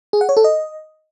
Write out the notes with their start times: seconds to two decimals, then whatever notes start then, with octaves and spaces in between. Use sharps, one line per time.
0.13 G#4
0.21 F#5
0.29 C#5
0.37 A4
0.44 D#5